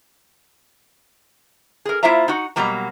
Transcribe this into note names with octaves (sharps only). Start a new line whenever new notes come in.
G#4 A#4
A#3 E4 F4 C5 E5 A#5
D#4 F#4
B2 F#3 G3 A#3 A#5